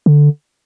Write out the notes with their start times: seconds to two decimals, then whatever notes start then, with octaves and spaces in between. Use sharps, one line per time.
0.06 D3